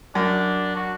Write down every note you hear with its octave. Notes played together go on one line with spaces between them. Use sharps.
F#2 D4
F#4